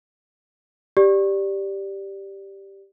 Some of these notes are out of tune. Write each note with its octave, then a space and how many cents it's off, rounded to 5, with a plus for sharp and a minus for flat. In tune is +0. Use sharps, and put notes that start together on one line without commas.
G4 +0 D5 +0